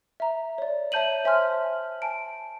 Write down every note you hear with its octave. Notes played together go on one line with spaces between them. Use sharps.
E5 A#5
C#5 D5
C#5 E5 A5 G6 D#7 F#7
C5 E5 G#5 C6 F6
G#5 A5 D7